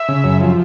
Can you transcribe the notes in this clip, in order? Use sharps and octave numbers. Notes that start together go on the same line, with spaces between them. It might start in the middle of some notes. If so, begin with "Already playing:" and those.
Already playing: E5
C#3
F#2
F3